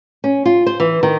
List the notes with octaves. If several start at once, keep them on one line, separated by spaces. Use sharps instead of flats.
C#4
F4
C5
E3
D#3